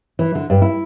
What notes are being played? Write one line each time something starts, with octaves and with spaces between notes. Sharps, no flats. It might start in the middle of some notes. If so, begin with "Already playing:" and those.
E3
D3
G2
E4